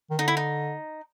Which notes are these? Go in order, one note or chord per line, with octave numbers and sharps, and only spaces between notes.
D#3
D3 D#4
E4
D#4